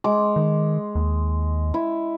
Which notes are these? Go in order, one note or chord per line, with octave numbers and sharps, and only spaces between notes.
G#3 D6
D#3
D#2
E4